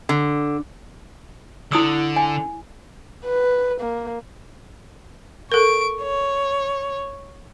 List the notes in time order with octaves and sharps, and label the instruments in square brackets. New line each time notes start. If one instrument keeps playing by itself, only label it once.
[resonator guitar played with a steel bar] D3
[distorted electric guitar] D3 [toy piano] E4 D#6 E6
[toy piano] G#5
[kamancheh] B4
A#3
[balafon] A4 A#4 [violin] C#6 D7
[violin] C#5